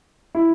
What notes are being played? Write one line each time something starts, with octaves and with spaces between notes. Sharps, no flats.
E4